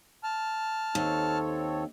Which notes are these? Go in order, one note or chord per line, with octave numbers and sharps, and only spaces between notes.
A5 F6
D#2 C4 A4 C#5